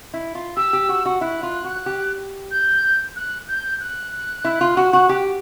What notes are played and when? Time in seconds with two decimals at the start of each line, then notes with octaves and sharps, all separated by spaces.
0.14 E4
0.35 F4
0.56 G4 E6
0.73 G4
0.89 F#4
1.06 F#4
1.21 E4 F#6
1.43 F4
1.64 F#4
1.86 G4
2.51 G6
3.16 F#6
3.48 G6
3.80 F#6
4.45 E4
4.61 F4
4.77 F#4
4.93 F#4
5.09 G4